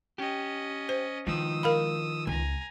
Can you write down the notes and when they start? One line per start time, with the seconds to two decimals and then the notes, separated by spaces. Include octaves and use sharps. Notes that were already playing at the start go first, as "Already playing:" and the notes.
0.18 C#4 G4 D#5
0.89 C5
1.27 D#3 F3 G#3 D#4 D#6 E6
1.63 A#4 F5 B5
2.27 C#2 G#5 A#5